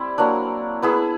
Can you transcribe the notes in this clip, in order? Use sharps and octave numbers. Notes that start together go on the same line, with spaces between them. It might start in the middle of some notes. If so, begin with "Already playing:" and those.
Already playing: G3 C4 E4
F#3 A#3 D4
B3 E4 G#4